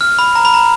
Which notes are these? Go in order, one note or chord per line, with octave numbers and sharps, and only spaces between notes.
F6
B5
A#5
B5
A#5